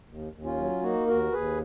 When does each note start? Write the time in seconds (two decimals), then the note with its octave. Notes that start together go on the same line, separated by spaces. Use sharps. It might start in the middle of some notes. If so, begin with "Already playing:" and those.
0.08 D#2
0.33 D#2
0.44 C#4 F4
0.57 F#3
0.82 A#3 D#4 F#4
1.07 D#2 F#4 A#4
1.32 D#2 G#4 B4